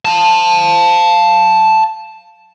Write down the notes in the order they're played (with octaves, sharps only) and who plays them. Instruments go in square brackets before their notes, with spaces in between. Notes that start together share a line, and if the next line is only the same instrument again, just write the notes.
[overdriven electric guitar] F5 A5